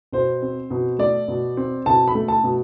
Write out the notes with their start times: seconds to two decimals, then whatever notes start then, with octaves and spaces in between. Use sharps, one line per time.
0.13 B2 C5
0.42 C4
0.71 B2
0.99 A3 D5
1.28 B2
1.57 C4
1.86 B2 A5
2.08 B5
2.15 A3
2.28 A5
2.44 B2